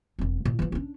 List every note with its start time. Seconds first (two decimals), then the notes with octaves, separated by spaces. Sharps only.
0.19 E1 C4
0.45 A#2
0.59 E3 F3
0.72 C#4 D4